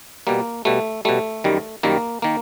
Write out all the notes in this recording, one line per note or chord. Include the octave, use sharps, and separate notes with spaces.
B2 G3 A#3
B2 G3 A3
B2 G3 A3
F#2 D#3 G3
F#2 D#3 G3 A#3
D#3 A#3